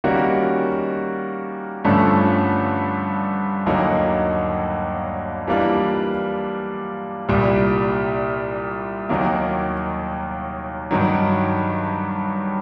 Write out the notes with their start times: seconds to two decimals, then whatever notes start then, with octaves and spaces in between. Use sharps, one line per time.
0.04 D#3 G3 A#3 C#4 F#4
1.84 G2 D3 F3 A3 C#4
3.66 D#2 D3 F#3 A#3 D#4
5.47 E3 G3 A#3 D4 F4
7.29 C2 A#2 G3
9.09 D#2 D#3 F#3 A#3
10.91 G2 D#3 F#3